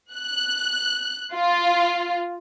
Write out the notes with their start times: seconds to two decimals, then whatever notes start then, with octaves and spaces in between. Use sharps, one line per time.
0.14 F#6
1.34 F4